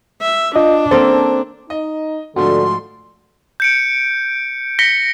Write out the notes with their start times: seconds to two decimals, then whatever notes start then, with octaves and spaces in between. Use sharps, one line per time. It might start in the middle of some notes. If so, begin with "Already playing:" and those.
0.22 E5
0.56 D4 F4 D#5
0.91 A#3 C4 A4 C5
1.70 D#4 D#5
2.36 G#2 D3 F3 A3 F#4 C6
3.60 G6 C#7 D7
4.79 A#6 B6 C#7 G7